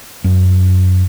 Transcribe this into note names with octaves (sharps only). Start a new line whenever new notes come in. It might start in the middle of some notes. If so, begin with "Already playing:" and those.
F#2